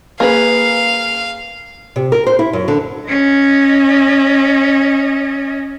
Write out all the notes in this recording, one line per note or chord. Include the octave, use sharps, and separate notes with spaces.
A#3 G#4 B4 F5
C3
A#4
C5
E4
F#2
D3
C#4 D#5